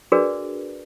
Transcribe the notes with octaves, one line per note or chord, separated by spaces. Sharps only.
D4 F#4 G#4 A#4 B4 D5